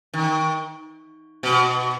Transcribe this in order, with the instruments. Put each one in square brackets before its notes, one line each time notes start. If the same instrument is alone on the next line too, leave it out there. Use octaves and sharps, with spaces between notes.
[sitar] D#3
B2